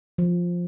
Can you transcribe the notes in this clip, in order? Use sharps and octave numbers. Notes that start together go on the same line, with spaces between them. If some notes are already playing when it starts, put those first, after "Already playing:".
F3